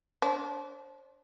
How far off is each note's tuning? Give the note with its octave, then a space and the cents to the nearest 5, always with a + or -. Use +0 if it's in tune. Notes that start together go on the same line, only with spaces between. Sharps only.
D4 -25 C5 +30